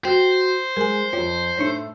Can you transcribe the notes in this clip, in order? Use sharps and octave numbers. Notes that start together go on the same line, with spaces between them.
F#4 C5 G5
G#3 A#4 G#5
F2 F4 C#5 G5
A2 A3 D4 D#4 C#5